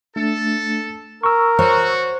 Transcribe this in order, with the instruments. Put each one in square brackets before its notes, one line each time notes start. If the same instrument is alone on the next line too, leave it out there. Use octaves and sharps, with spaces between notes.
[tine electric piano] A3 D4 [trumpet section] A4
[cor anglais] A#4 [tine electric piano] C#6 E6
[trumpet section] F#4 [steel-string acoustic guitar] C5 C#5